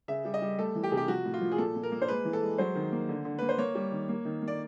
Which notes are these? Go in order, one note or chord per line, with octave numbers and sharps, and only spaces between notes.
C#3 E5
G3
D#5
G3
A3 A4
E3
G4
C3 G#4
G4
F3 F#4
A2
F4
F3
G#4
A#2 A4
A#2
A#4
A#3
C5
G#3 B4
E3
A4
G#3
F#3 C5
D#3
A#3
D3
D3
A#3 B4
C5
A#3 C#5
G3
D#3
A#3
D#3
A#3
D5